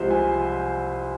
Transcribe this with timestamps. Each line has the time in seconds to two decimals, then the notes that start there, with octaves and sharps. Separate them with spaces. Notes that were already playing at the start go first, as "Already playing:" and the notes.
Already playing: C2 C3 F3 G#3 C5
0.11 G#5